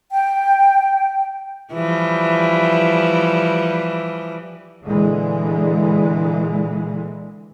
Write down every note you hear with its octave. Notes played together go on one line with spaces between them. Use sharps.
G5
E3 F3 G3
A#2 D3 E3 G#3